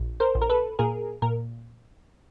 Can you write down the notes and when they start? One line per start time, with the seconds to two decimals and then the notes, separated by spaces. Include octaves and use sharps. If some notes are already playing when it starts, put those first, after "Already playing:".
Already playing: A#1
0.20 A#4 C5
0.35 A#1
0.41 A#4
0.49 A4 B4
0.79 A#2 G#4 A#4
1.22 A#2 A#4